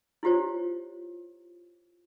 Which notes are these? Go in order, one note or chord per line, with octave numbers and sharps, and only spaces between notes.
E4 F4 G4 C5 C#5